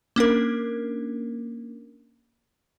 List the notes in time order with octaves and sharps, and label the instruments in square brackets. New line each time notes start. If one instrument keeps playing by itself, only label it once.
[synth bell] A#3 C#4 D4 A#4